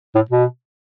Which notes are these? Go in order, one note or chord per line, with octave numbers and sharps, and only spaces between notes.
A2
B2